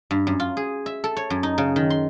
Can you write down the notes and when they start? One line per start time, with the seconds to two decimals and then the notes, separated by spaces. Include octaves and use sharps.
0.11 G2
0.27 F#2
0.40 F4
0.57 G#4
0.86 E5
1.04 A4
1.17 C#5
1.30 F#2
1.43 D#4
1.58 C#3
1.76 D#3
1.90 C6